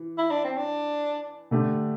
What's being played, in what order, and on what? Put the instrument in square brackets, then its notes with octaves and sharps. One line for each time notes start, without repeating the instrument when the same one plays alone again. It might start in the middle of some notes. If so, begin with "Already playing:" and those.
Already playing: [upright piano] E3
[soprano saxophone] E4
D4
C4
D4
[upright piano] D3 A3 D4 G4